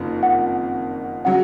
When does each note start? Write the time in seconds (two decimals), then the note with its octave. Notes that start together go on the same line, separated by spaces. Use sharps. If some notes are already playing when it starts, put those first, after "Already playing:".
Already playing: F#1 F2 D#3
0.23 F#5
1.25 C#3 F#3 F#5